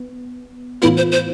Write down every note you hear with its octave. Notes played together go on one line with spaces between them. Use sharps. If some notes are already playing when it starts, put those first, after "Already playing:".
Already playing: B3
A2 E3 B3 E4 F4
C5
C5